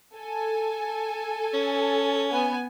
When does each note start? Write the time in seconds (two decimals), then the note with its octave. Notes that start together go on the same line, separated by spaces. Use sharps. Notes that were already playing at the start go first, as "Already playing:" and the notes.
0.14 A4 G#5
1.54 C#4
2.30 B3 G#5